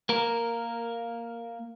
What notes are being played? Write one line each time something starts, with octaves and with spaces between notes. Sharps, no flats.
A#3 A#4